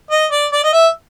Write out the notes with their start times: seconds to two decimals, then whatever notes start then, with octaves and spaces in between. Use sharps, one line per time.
0.11 D#5
0.31 D5
0.52 D5
0.64 D#5
0.73 E5